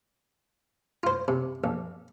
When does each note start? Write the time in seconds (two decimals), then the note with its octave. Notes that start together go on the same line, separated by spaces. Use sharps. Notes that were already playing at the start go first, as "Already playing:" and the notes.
1.03 F4 C5
1.28 C3
1.64 A#1